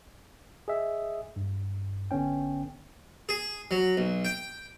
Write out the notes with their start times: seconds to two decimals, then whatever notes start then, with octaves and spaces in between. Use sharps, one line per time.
0.68 G#4 D#5 E5
1.36 G2
2.11 A1 D3 B3 C#4 G5
3.29 G#4
3.71 F#3
3.97 B1
4.25 G5